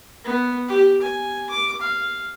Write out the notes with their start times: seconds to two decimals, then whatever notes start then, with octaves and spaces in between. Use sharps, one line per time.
0.25 B3
0.68 G4
1.02 G#5
1.50 D6
1.81 F5